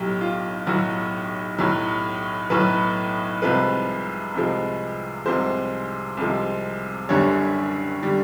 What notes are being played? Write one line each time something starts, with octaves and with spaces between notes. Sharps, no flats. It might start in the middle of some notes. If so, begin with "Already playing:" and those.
Already playing: B1 A2 F#3 G4
F4
B1 A2 F#3 F#4
B1 A2 F#3
B1 A2 F#3 B4
C2 C3 F3 G#3 B4
C2 C3 F3 G#3
C2 C3 F3 G#3 C5
C2 C3 F3 G#3
F#1 F#2 D3 G3 C#5
D3 G3